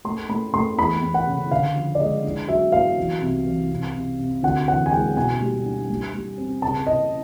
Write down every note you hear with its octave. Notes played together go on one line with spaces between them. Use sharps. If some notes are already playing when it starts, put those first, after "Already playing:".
A3 C6
A3 B5
A3 C6
E2 B5
E2
F#5
C#3
D3 F5
F3
D5
G#3 D#5
D4
F#3 E5
B3 F5
E3
C2
E3
C3
C3
C3
D2 F#5
E3 F#5
G#5
G#3 G5
B2 G#5
G3
D4
G3
G3
C4
C#3 A5
C#3 D#5